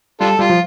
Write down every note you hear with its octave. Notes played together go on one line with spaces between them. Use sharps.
G3 D4 F4 A4
G3 F4
F3